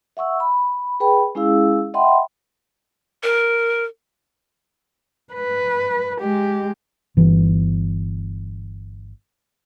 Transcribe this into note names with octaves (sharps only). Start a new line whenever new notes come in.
E5 F#5 C#6 E6
B5
G#4 B4 G5 B5
G#3 C#4 E4 G#4 F5 E6
D#5 E5 F#5 G5 B5 C6
A#4
B4
G#3 G4
G1 E3